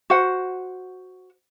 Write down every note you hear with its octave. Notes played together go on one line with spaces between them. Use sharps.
F#4 C5 F#5